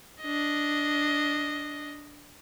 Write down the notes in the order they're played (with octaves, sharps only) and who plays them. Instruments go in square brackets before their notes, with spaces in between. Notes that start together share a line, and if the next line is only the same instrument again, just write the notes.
[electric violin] D4 D#5